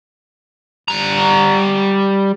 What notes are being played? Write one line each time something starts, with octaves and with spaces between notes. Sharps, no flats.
G3 A#5